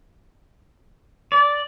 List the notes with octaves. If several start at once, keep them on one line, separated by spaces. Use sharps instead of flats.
D5